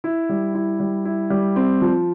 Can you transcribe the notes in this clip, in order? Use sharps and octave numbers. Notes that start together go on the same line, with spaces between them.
E4
G3
E4
G3
E4
G3
C4
F3